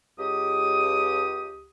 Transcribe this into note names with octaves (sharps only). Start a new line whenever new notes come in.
C#2 G4 D#6